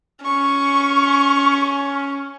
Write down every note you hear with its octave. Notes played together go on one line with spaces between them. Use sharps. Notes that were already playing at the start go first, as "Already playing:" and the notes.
C#4 C#6